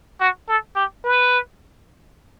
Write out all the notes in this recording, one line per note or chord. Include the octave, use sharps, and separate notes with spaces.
F#4
A4
G4
B4